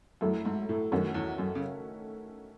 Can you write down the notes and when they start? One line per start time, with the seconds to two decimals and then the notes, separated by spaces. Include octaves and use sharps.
0.21 F#2 F#3 A3 E4
0.45 G#2
0.69 A2
0.91 F#2 D#3 A3 C#4 F#4
1.14 E2
1.38 F#2
1.55 C#3